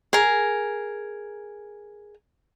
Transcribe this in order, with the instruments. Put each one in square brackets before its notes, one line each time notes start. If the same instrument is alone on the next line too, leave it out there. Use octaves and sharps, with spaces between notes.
[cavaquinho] G#4 A#4